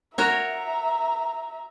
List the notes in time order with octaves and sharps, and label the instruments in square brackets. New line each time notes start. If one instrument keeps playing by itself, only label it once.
[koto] F#4 A#4 C#5 [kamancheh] E5 A#5